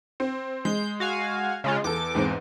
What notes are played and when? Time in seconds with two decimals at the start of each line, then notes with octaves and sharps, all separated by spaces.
0.20 C4
0.65 G#3 G6
1.00 F#4 F5 G#5
1.64 C#3 G#3 F4
1.84 E2 A4 D6
2.15 E2 G#2 C4